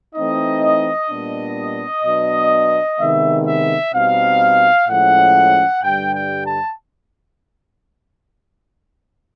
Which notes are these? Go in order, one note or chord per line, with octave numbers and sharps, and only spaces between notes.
E3 A3 C4 D#4 D#5
A#2 G3 B3 D4
B2 F#3 B3 D4
C3 D#3 G#3 B3 E5
E5
B2 G3 C4 D#4 F5
A2 F3 G#3 C#4 F#5
G2 D3 G3 G5
G5
A5